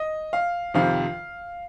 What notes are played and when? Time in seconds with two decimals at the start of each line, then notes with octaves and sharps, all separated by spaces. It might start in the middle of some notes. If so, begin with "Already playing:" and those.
Already playing: D#5
0.33 F5
0.74 F2 C3 D#3 F5